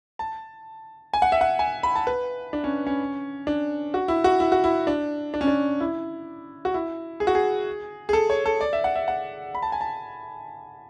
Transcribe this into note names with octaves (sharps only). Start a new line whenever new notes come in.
A5
G#5
F#5
E5
F#5
G#5
B5
A5
B4
D4
C#4
C#4
D4
F#4
E4
F#4
E4
F#4
E4
D4
D4
C#4
D4
E4
F#4
E4
G#4
F#4
G#4
G#4
A4
C#5
A4
D5
E5
F#5
E5
F#5
B5
A5
G#5
A5